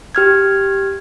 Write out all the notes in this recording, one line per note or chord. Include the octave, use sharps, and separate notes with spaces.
G4 F6 G#6